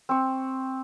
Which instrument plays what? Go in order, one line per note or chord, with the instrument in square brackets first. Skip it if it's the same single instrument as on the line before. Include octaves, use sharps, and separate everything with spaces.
[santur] C4 C#6